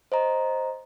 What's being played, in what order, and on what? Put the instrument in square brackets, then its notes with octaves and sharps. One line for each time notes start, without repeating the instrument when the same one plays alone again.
[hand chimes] C5 D#5 A#5